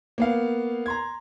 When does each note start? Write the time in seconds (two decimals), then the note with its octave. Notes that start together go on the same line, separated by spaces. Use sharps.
0.18 A#3 B3 F5
0.86 A#5 C6 G#6